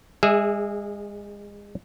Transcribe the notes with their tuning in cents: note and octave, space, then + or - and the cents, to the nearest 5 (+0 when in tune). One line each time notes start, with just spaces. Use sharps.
G#3 -30 G#4 +0 E5 +0